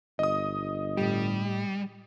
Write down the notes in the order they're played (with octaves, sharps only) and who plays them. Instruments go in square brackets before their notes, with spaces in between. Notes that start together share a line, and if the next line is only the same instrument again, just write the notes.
[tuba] G1 [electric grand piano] D#5 D#6
[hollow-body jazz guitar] A2 G4 [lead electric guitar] G3